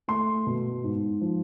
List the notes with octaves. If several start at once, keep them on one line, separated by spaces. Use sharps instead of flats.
A3 C6
B2
G#2
F3